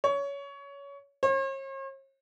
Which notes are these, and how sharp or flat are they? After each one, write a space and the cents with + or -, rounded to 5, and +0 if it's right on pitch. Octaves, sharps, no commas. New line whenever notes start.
C#5 +20
C#5 -45